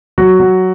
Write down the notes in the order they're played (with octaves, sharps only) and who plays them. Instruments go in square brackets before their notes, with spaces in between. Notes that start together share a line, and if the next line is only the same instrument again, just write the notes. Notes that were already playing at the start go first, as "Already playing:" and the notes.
[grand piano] F#3 F#4
F#3